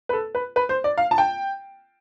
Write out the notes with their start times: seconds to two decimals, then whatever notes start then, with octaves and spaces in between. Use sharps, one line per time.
0.09 B4
0.13 A4
0.35 B4
0.56 B4
0.69 C5
0.84 D5
0.98 F5
1.11 A5
1.18 G5